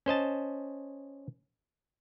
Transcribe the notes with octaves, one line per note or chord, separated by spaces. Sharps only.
C#4 C5 D#5 A5